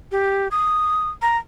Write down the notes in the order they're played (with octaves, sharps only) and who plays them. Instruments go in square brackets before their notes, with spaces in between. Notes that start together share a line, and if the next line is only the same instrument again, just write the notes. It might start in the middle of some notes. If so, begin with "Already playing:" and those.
[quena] G4
D#6
A#5